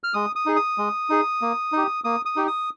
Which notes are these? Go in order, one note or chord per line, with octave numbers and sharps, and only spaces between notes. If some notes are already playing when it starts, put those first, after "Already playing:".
F6
G#3 D#6
D#6
D#4 G#4
D#6
G#3
D#4 G#4
A#3
D#4 G4
A#3 D#6
D#6
D#4 G4
D#6